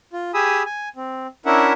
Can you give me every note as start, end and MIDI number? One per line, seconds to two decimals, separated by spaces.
0.13 0.31 65
0.34 0.63 67
0.34 0.63 68
0.34 0.63 80
0.34 0.63 83
0.34 0.63 87
0.34 0.63 88
0.65 0.89 80
0.96 1.27 60
1.46 1.73 61
1.46 1.73 62
1.46 1.73 64
1.46 1.73 70
1.46 1.73 76
1.46 1.73 78